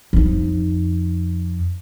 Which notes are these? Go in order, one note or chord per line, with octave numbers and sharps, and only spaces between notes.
F2 D#4